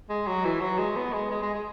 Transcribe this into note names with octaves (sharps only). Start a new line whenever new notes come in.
G#3
F#3
E3
F#3
G#3
B3
G#3
G#3
G#3
G#3